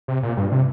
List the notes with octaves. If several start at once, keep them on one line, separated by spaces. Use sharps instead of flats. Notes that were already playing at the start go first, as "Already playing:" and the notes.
C3
A#2
G2
C3